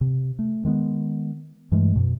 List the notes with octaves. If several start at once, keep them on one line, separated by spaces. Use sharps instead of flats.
C3
A3
D#3 G#3 A3 B3
G2 E3 G#3 A3
F#2 B2